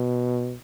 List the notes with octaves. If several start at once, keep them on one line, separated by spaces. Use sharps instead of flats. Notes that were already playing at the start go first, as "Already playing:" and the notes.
Already playing: B2